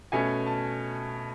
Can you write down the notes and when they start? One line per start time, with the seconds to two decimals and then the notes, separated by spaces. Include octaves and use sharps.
0.12 B2 A3 C#4 G#5
0.47 A5